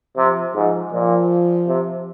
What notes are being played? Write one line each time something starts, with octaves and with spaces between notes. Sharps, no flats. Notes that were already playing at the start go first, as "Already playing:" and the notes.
C3 F3
G#2 F3
A#2 F3
C3